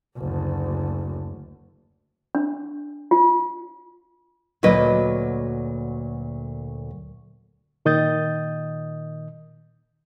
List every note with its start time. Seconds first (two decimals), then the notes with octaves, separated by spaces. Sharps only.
0.17 F#1 D2
2.35 D4
3.11 F4
4.63 D2 A#2 F#3 B4 D#5
7.85 A#2 D#3 D#5 D#6 G6 A6